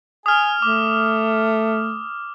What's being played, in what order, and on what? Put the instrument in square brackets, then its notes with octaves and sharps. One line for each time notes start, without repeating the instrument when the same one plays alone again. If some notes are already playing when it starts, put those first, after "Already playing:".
[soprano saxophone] G#5 [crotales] D#6 F6
[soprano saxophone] A3 [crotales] D6